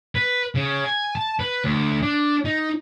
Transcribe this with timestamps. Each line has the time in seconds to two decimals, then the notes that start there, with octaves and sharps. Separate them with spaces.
0.15 B4
0.55 C#3
0.85 G#5
1.15 A5
1.40 B4
1.64 D2
2.02 D4
2.45 D#4